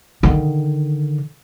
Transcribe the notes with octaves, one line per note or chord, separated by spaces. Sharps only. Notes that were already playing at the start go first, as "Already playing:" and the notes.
D3 D#3